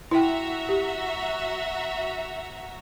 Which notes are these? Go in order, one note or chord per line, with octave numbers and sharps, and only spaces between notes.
E4 F#4 E5 G5 A#5
G4